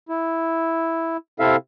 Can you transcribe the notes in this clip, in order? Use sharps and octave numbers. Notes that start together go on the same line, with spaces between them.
E4
C3 C4 E4 A4 E5 F5